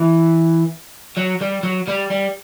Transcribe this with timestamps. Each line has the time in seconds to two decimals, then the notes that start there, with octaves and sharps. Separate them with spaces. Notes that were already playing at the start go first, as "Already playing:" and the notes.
Already playing: E3
1.17 F#3
1.41 G3
1.63 F#3
1.87 G3
2.10 G3